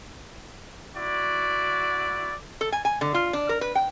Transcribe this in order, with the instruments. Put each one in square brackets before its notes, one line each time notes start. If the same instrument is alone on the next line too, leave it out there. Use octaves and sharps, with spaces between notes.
[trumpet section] E4 F#4 D5
[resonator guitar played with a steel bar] A4
G#5
G#5
D3
F4
D4
A#4
B4
G5